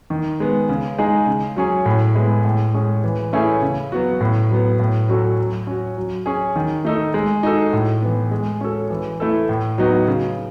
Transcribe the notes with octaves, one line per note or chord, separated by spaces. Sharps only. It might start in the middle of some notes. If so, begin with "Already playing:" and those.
D#3
G#3 B3
C#3
G#3 D#4 G#4
C#3
F#3 C#4 G#4
A2
G#3 B3 E4
A2
G#3 C#4 G#4
E3
A3 C#4 E4 G#4
C#3
F#3 B3 F#4
A2
F#3 B3
A2
F#3 C#4 F#4 A4
F#3
C#4 F#4
F#3
C#4 G#4
D#3
A3 D#4 A4
G#3
D#4 F#4 A4
A2
E3 B3
G#3
C#4 F#4 A4
E3
A3 E4 A4
A2
F#3 B3 D#4 F#4
C#3